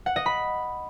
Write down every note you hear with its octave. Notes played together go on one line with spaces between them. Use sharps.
F#5
D#5
B5